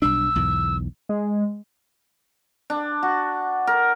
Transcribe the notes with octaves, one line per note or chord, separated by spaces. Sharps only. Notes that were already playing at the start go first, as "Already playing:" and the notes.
B1 G3 D4 E6
B1 E2 G#2
G#3
D4
F#4
A#4